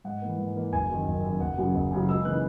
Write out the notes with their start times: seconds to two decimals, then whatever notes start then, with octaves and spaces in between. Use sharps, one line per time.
0.04 G#2 F#5
0.22 E3 A#3
0.38 G#2
0.56 E3 A#3
0.72 F#1 G#5
0.89 F#2 D#3
1.06 F#1
1.23 F#2 D#3
1.40 F#1 F#5
1.57 F#2 C#3 F#3
1.75 F#1
1.91 F#2 C#3 F#3
2.09 C#2 E6
2.25 C#3 E3 A#3 D#4 F#6